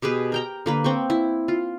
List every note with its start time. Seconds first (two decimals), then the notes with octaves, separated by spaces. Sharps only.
0.02 B2 G4 G#4 B4
0.32 A#4 G5 A#5
0.66 D3 A#3 B4
0.84 C4 G5 C#6
1.10 E4
1.48 F4